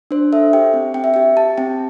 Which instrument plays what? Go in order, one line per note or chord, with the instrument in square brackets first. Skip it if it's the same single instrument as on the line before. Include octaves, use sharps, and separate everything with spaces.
[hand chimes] D4 C5
A4 E5
G4 G5
C4
C4 G5
E5
G4 G5
G4 A5
C4 G5